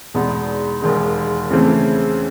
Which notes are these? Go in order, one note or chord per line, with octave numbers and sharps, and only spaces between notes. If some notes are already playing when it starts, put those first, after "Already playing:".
E2 B2 G#3 B3 D#4
E1 D#2 D#3 G#3
C#3 E3 A3 C4